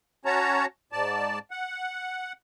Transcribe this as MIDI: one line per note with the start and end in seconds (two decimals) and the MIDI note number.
0.25 0.66 61
0.25 0.66 66
0.25 0.66 73
0.25 0.66 81
0.25 0.66 82
0.92 1.39 44
0.92 1.39 74
0.92 1.39 81
1.51 2.33 78